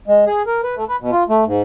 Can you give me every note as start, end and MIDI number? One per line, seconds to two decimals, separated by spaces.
0.08 0.25 56
0.27 0.43 68
0.47 0.61 70
0.63 0.75 71
0.77 0.85 57
0.89 0.96 71
1.01 1.11 47
1.12 1.23 65
1.29 1.44 57
1.47 1.62 44